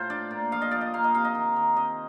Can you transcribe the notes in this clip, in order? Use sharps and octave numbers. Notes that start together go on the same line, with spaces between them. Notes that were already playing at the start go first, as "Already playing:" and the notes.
Already playing: A2 F4 C5
D4 D5
A#2
F3 F5
D#5
F3 D5
D#5
A#3 F5
D#5
C3 F5
D#5
D#3
D#3
C4 D#5